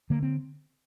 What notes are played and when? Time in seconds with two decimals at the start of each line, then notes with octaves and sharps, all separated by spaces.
0.10 D3 A#3
0.23 C4